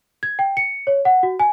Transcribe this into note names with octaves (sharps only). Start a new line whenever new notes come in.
G#6
G5
C#7
C#5
F#5
F#4
G#5